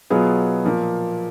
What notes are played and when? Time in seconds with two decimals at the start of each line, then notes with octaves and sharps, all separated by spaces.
0.10 B2 F#3 B3 F4 G#4
0.64 A#2 F3 A#3